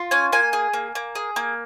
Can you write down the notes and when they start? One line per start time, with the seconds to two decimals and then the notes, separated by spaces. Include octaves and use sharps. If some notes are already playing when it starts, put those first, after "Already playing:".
Already playing: F4
0.11 C#4 G#5
0.32 A#3 G#5
0.53 G#4
0.73 A#3
0.95 A#3
1.15 G#4
1.36 A#3